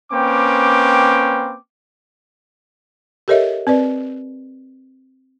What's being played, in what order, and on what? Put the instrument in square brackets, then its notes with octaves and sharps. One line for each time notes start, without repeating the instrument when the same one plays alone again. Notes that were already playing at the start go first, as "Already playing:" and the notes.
[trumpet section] A#3 C4 C#4 B4 G5 D6
[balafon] G4 A4 A#4 C#5 D#5 E5
C4 B4 D5